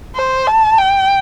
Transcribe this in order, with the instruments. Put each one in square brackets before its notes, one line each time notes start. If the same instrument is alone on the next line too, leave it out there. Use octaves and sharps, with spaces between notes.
[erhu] C5
A5
G5